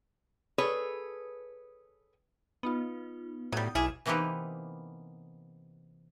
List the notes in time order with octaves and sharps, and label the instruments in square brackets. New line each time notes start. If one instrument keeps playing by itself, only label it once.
[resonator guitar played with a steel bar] G#4 A4 B4 C#5
[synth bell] B3 D#4 F4
[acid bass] A2 [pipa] F#3 G3 [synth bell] D#6 G6
[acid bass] B1 [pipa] E4 G#4 [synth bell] D6 F6 E7
[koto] C3 E3 A#3 B3 D#4 G4